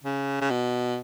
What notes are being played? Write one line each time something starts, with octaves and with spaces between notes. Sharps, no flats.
C#3
C#3
B2